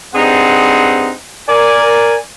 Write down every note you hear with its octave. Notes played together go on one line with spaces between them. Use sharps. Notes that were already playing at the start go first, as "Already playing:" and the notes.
G2 C4 D#4 G#4 C5 F#5
A#4 D5 G#5